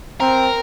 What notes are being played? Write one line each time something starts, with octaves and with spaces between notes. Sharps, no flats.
C4 A#4